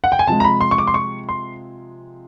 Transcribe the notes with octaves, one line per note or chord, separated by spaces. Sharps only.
F#5
G5
G#5
C3 F3 G#3 A5
A#5
B5
C6
C#6
D6
C6
C#6
C6